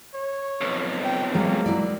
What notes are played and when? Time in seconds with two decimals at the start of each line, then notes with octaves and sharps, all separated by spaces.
0.14 C#5
0.61 B1 F2
1.04 G5
1.34 F#3 G#3 A#3
1.66 F#3 E4 D5